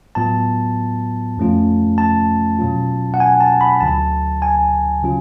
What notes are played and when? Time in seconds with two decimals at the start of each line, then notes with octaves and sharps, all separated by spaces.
0.15 A2 F#3 B3 F4 A5
1.37 F2 F3 A3 C#4 F4
1.98 A5
2.59 B2 F#3 C#4 F4
3.14 F#5
3.20 G#5
3.41 A5
3.61 B5
3.80 D2 D3 F#3 A5
4.42 G#5
5.03 C#3 F#3 C#4 F4